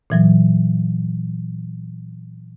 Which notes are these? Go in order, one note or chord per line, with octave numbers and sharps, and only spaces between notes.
A#2 E3 F#3